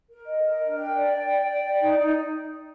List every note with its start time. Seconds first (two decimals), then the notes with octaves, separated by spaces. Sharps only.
0.10 A#4
0.27 D#5
0.44 A#4
0.60 D4
0.78 G5
0.95 D5
1.13 G5
1.30 D5
1.47 G5
1.64 D5
1.81 D#4
1.98 D#4